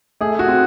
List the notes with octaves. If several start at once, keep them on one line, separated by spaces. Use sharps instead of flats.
A3 G#4
F#4
C4